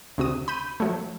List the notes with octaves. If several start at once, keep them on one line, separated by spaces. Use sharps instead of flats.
D2 C3 F#4 D#6
B5 G6 D#7
F3 F#3 A3